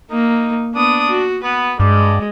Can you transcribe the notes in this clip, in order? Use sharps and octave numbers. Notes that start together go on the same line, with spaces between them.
A#3 D#4
B3 D4 D#6
F#4
B3 B4
G2 G#3 D5